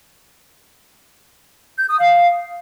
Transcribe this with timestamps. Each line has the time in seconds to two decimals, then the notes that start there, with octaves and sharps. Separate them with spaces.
1.79 G6
1.89 D#6
1.99 F5